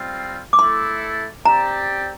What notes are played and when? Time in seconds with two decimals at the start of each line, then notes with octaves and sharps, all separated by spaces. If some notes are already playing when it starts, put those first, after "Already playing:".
Already playing: G3 C4 F4
0.53 D6
0.59 A3 E4 A4 C6
1.44 C4 G4 D5 A#5